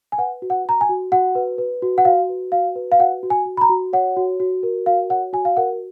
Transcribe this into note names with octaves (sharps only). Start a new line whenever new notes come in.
G#5
B4 F#5
F#4
F#5
F#4 A#5
G#5
F#4
F#4 F#5
B4
B4
F#4
F#5
F#4 F5
B4
F#4 F5
B4
F5
F#4 F#5
F#4
G#5
F#4
B5
A#5
F#4
C#5 F#5
F#4
F#4
A#4
F#4 F5
C#5 F#5
F#4 G#5
F5
A#4 F#5